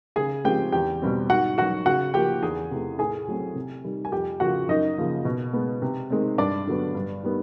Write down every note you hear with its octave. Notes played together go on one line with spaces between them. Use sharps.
C#3 G#4 G#5
F3 G#3 C4 G4 G5
E2 G4 G5
B2 G3 C4
G#2 F#4 F#5
D#3 F#3 F#4 F#5
C#3 F#4 F#5
F3 A#3 G4 G5
E2 G#4 G#5
C3 E3 A3
A2 G#4 G#5
F#3 A3 C4
C3
D#3 G3
G#5
F2 G4 G5
C#3 F3 F#4 F#5
F#2 D#4 D#5
C#3 F3 A#3
B2
G#3 B3
C3
D#3 G#3 C4
G2 D4 D5
D3 F#3 B3
G2
D#3 G3 B3